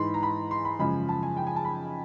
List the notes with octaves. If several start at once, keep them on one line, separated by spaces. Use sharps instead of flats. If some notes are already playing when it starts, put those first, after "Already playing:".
Already playing: G#2 E3 G#3 B5 C6
A#5
B5
C6
B5
F#2 C#3 F3 G#3 B5
A5
G#5
G5
G#5
A5
B5